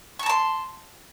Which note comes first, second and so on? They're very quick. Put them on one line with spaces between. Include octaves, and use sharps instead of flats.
C#6 A5 A#5 C6